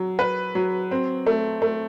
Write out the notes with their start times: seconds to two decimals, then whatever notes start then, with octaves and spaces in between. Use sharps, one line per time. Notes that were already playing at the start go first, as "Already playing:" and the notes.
Already playing: F#3
0.19 B4
0.55 F#3
0.91 C4
1.26 A3
1.62 A3